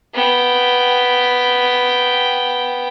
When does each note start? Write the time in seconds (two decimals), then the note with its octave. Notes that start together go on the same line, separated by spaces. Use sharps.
0.15 B3 G5